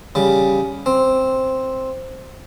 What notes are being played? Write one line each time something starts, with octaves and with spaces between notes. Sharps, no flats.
C#3 G3
C4